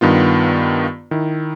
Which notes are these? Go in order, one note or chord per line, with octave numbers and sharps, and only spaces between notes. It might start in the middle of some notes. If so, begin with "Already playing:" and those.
G2 D#3 B3 F4
D#3 E4